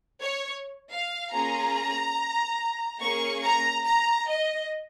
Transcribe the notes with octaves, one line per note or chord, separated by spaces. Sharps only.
C#5
F5
A#3 C#4 F4 G#4 A#5
A#3 C#4 G#4 C#6
A#5
A#5
D#5